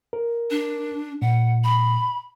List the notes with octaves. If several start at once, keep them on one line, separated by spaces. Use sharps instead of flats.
A#4
D4
A#2 F#5
B5